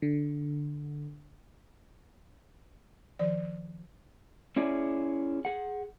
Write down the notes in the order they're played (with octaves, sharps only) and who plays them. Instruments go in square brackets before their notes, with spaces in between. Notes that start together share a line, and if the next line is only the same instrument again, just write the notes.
[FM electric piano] D3
[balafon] D#3 F3 D5
[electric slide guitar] C#4 E4 G#4 D5
G#4 F#5